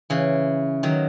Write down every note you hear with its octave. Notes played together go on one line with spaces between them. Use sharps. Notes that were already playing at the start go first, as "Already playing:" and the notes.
C#3 E3
D#3 F#3